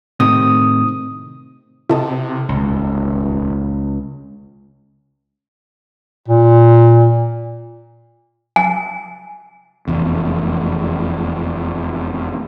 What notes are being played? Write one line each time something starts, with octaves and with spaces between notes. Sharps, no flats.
A2 C3 D#3 D#6
C3 E4 A4 D#5
D#1 C#2
A#2
G#5
F1 E2